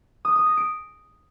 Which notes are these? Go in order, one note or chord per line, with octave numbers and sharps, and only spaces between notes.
D#6
D#6
A#6
D7